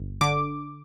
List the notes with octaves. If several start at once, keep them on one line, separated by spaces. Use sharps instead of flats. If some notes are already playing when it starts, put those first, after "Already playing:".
Already playing: G1
D3 D6